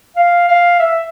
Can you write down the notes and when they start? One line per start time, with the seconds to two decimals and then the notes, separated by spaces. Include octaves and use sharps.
0.17 F5
0.48 F5
0.80 E5